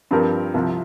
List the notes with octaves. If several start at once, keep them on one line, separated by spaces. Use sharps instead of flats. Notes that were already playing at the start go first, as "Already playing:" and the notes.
G2 F3 C4 G4 A#4
C2 C3 F3